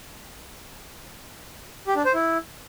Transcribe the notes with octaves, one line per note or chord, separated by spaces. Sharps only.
G4
D4
C5
E4